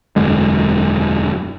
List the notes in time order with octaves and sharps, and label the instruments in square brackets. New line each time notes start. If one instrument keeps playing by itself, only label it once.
[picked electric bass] E1 F#2 D3 G#3